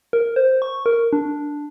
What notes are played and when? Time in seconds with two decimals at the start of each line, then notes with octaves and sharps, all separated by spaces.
0.13 A#4
0.36 C5
0.62 C#6
0.86 A#4
1.13 D4